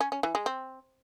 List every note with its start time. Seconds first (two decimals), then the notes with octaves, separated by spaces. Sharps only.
0.01 C#4
0.12 C#4
0.23 E3
0.35 G#3
0.46 C4